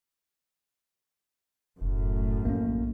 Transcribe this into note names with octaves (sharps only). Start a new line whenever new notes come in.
F1 F#2 A2
A#1 A#3 C#4